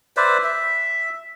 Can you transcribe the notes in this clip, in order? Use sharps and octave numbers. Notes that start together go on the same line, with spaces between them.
B4 C5 D5 E5
E5